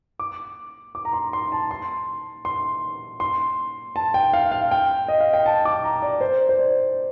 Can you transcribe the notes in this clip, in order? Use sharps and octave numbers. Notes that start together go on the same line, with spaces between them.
D6
D6
A#5
C6
C6
A5
C6
C6
C6
A5
G5
F5
F5
G5
D#5
F5
G5
A5
D6
A#5
D5
C5
C5
D5